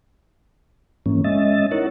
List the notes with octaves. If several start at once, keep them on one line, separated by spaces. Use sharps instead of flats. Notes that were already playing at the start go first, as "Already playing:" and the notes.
G#2 E3 A#3 C#4
G#3 C#4 D#5 E5 A6
D#4 E4 A#4 C#5 F#5